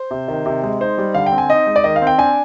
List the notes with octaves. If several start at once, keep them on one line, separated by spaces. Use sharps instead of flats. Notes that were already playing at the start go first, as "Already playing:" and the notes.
Already playing: C5
C3
D#3
C3
G#3
D#4 C5
G3
D3 F5
G5
C4
G#5
D#4 D#5
G#3
D5
D#3 D#5
F5
C4
G5
D4 G#5